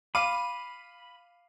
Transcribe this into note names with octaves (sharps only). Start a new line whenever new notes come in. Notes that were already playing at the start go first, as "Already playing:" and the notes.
F5 B5 D6 D#7